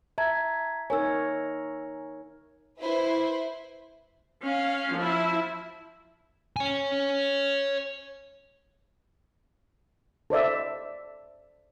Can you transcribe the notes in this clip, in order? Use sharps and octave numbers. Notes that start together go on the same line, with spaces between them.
E5 A5 A#5 G#6
D#4 A#4 C#5 G#5 E6
E4 B4 C5
C#4 F5
F3 E4
C#5 G#5
A4 C5 D5 E5